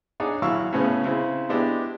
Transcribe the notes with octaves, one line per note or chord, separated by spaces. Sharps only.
D4 D#4 G#4 C#5 D5 F#5
G#1 F#3 E4 F5 C#6 E6
A2 C#3 B3 C#4
C#3 C4 E4
G#3 B3 D4 E4 G4